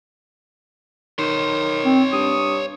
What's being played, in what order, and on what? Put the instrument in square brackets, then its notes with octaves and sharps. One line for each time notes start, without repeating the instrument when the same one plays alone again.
[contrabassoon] D#3 [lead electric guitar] C#5 C6
[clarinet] C4
[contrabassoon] G2 [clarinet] D#6